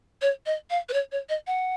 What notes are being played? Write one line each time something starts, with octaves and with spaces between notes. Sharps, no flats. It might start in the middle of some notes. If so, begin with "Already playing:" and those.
C#5
D#5
F5
B4
C#5
C#5
D#5
F#5